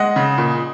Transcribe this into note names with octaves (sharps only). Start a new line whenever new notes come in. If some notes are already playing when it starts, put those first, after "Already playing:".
Already playing: G#3 D#5 F#5
C#3
A#2